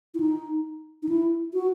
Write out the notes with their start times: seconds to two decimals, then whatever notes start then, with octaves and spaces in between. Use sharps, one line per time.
0.14 E4
0.20 D#4
1.03 D#4
1.09 E4
1.54 F#4